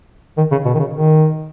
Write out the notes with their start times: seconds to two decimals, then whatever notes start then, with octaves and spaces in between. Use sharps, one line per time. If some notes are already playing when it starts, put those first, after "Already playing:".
0.37 D#3
0.51 C#3
0.65 B2
0.74 D#3
0.79 C#3
0.93 D#3